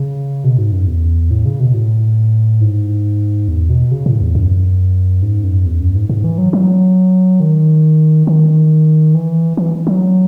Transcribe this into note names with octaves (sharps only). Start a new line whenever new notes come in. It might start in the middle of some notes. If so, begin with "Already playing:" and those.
Already playing: C#3
B2
G#2
F#2
E2
A2
C#3
B2
A2
G#2
E2
B2
C#3
A2
E2
F#2
G#2
F#2
E2
F#2
G#2
G#2
E3
F#3
F#3
D#3
D#3
E3
E3
F#3